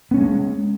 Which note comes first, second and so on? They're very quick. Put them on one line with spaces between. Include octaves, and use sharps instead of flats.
B3 C#4 A3 G#3